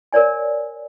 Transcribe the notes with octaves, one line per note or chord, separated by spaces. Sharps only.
A#4 C#5 D5 G#5